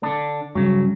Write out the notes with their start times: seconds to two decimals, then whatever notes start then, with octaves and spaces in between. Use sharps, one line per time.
0.03 D3 D4
0.55 G2 C#3 F#3